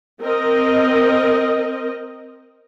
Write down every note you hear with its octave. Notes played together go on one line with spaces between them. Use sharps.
C4 A#4 D#5